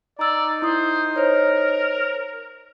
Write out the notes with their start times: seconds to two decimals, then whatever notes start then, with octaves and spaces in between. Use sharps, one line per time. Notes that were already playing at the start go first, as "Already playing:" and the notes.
0.19 D#4 D5 A#5 E6
0.62 E4 C5 D#6
1.16 A#4 C5 C#5